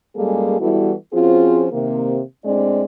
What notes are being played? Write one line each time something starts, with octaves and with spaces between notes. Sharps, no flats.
F#2 G3 G#3 A#3 G#4 A4
E3 G3 B3 E4 F#4 A4
F3 C4 C#4 F4 F#4 G#4
C3 D#3 A#3
A2 G#3 C4 D4 D5